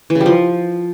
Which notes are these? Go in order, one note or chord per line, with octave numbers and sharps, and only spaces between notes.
E3
C#3
G3
F3